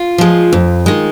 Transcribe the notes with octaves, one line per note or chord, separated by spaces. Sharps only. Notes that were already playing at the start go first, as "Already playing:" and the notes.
Already playing: F4
F3 G#3
F2
D#3 G#3